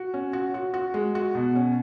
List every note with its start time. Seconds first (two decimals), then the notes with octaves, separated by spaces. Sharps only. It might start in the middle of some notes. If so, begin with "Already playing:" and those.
Already playing: F#4
0.14 C#4
0.33 F#4
0.54 F#4
0.74 F#4
0.94 G#3
1.15 F#4
1.35 B2
1.56 C#4